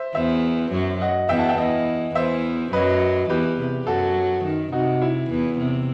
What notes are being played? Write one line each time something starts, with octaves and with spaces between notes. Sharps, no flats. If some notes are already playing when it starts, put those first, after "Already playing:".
Already playing: C5 E5
E2 E3 C5 E5
F#2 F#3
D#5 F#5
E2 E3 E5 G5
F#5 A5
E5 G5
E2 E3 D#5 F#5
E2 E3 C5 E5
F#2 F#3 B4 D#5
E2 E3 G4 B4
C3
F#2 F#3 F#4 A4
D#3
C3 D#4 F#4
E4
E2 E3
C3